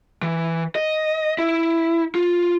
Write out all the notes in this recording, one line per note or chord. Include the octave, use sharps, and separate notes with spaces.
E3
D#5
E4
F4